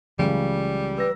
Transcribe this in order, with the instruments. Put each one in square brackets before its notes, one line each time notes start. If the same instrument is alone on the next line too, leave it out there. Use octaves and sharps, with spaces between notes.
[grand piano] C#2 C#3 [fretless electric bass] E3 F#3 A3 [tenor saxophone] G3
[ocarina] B4 [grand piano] E6 A#6